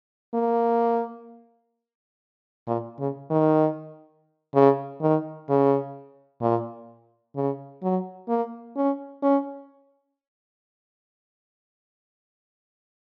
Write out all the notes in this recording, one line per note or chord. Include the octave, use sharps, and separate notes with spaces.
A#3
A#2
C#3
D#3
C#3
D#3
C#3
A#2
C#3
F#3
A#3
C#4
C#4